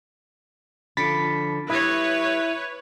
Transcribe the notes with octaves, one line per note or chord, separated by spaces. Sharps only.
D3 F3 D4 B5 A6 B6 C#7 D7
G3 E4 B4 C#5 E5 D#6 G#6 A#6